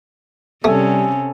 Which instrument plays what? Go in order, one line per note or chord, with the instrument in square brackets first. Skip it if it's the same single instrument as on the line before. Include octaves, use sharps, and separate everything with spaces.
[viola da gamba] C3 C#4 [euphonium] G3 [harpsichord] A3 [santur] G#4 A4 G#5